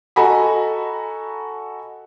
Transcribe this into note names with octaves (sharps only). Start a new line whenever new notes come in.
F#4 A4 D#5 G#5 A#5 B5